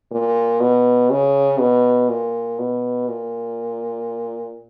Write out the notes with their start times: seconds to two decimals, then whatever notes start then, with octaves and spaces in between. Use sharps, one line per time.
0.11 A#2
0.60 B2
1.10 C#3
1.59 B2
2.09 A#2
2.59 B2
3.08 A#2